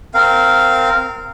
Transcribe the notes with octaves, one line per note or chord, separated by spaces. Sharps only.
C4 A#4 F5